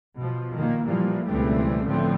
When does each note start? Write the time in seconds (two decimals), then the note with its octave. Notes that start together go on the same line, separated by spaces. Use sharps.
0.16 B2 F3
0.55 A#2 D#3 A#3
0.85 A#2 E3 F3 G3 A#3
1.27 C#2 B2 E3 G3 A3 C4
1.85 A2 D3 F3 A3 B3 C4